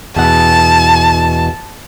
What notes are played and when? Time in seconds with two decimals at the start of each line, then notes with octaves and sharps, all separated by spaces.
0.16 E2 B2 F#5 A5